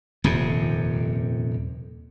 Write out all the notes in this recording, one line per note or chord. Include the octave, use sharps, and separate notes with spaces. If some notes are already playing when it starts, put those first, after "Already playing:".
D#1 F2 C3